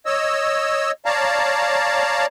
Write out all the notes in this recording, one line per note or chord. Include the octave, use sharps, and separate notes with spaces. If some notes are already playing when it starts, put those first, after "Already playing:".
C#5 D#5 E6
C#5 D5 F5 A5 A#5